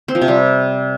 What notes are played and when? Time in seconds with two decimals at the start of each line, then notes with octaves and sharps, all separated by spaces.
0.08 C4
0.15 F3
0.22 C3
0.28 G3